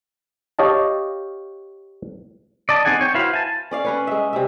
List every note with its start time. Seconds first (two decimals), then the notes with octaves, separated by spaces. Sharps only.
0.59 G4 C#5 D#5 F5 A5
2.69 D5 D#5 A5
2.85 C4 D#4 G#4 F#5 G#5
3.01 C#5 G5
3.14 E4 F#4 B4 C5 F5
3.33 G#5 A5
3.71 C#4 D5 F5
3.85 C#4 B4 C#5
4.07 G#3 E5
4.33 C3 D5 E5